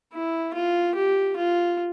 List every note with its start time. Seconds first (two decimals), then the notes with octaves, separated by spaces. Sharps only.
0.14 E4
0.54 F4
0.95 G4
1.37 F4